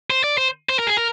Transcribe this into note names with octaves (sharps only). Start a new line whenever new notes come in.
C5
D5
C5
C5
A#4
G#4
A#4